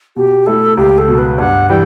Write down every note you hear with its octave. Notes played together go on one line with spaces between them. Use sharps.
B2 G4
A3 E4 A4
C#2 G4
A4
B2 F#3
B4
G2 F#5
E3 G3 G5